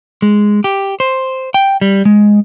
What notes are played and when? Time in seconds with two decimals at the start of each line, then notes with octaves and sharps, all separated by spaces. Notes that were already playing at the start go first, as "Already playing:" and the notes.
0.22 G#3
0.64 G4
1.00 C5
1.54 G5
1.81 G3
2.05 G#3